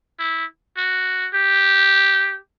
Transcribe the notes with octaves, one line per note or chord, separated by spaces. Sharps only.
E4
F#4
G4